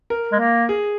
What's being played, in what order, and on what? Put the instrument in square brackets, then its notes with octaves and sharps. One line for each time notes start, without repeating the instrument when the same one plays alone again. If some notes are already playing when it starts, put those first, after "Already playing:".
[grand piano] A#4
[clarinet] G#3
A#3
[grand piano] G#4